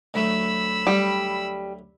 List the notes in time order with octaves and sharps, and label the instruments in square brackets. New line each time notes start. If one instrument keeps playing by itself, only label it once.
[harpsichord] D2 F#3 A3 [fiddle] B5 E6
[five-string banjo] G3